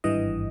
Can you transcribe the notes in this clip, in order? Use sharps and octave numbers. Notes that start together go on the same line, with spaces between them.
G#1 G2 E3 D#5